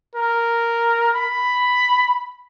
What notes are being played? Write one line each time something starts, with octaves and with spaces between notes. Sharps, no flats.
A#4
B5